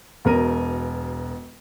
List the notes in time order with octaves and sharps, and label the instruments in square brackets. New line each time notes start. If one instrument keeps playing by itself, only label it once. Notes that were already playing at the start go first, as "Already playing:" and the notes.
[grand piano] E1 B2 A#4 D#7